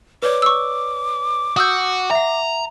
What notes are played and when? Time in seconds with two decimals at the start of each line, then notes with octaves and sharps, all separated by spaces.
0.22 B4 C#5 D5 D6
0.42 C#6 E6
1.57 F#4 D#6 E6 G6
2.11 E5 F#5 A#5